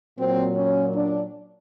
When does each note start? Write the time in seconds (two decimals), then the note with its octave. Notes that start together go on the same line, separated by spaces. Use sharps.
0.19 A#2 F#3 C4
0.57 C#4
0.95 D4